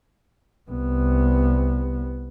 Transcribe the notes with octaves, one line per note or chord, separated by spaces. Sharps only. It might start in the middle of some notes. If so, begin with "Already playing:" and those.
C2 B3